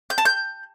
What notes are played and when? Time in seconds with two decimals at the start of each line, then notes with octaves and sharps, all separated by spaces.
0.10 G6
0.18 A5
0.25 G6